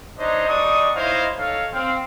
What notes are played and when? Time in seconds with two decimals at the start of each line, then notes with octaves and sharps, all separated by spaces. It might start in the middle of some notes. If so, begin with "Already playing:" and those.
0.18 D4 D#4 C5 C#5 D#5
0.47 G3 D4 D#4 C#6 D#6
0.95 D#4 E4 C5 C#5 D#5 F5
1.37 D#4 A4 C#5 F5
1.72 C4 F5